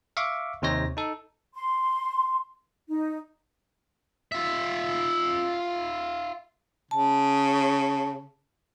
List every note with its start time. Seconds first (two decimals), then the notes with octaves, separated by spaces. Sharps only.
0.17 E5 F5 C#6 D6
0.62 D#2 C3 D#4 C5 C#5 A#6
0.97 D#4 A4
1.54 C6
2.88 D#4
4.32 F4 E5
6.91 C#3 A5